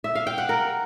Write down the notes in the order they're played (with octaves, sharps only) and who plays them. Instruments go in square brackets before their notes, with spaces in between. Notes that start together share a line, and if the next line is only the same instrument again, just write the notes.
[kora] E5
F5
G5
F#5
A#4